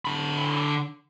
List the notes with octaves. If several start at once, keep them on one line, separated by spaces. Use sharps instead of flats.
D3 B5